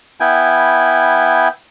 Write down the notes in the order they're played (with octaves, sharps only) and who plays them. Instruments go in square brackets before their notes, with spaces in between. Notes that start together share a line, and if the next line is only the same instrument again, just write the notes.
[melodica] B3 E4 G5 G#5